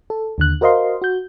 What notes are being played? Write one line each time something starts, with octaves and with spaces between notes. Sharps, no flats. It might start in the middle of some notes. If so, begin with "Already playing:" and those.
A4
D#2 D3 F#6
F#4 A#4 C5 D#5 F5 C6
F#4 G6